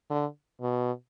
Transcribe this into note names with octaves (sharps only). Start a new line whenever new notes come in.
D3
B2